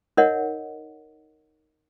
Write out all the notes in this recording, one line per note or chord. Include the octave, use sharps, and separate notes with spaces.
D#4 A#4 C#5 D#5 F#5